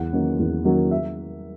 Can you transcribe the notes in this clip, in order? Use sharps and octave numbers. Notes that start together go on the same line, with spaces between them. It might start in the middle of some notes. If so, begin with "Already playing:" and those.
Already playing: E2 F#5
D#3 F#3 A#3 C#4
E2
D#3 F#3 A#3 C#4
E5